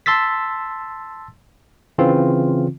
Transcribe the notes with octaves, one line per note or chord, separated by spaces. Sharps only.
A5 C6 E6 A6 B6
C#3 E3 C4 F4